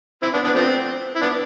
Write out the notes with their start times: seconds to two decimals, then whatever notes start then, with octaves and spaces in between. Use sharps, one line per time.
0.22 C4 E4
0.34 B3 D4
0.44 B3 D4
0.55 F3 A3 C4
1.16 E4
1.22 B3 D4